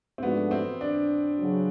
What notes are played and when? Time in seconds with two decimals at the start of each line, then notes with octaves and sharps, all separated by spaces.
0.18 C4
0.21 G#2 F3 A3 B3 D4 F#4
0.51 C4
0.81 D4
1.39 C#3 F#3